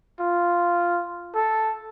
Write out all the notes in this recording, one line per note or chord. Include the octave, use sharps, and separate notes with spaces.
F4
A4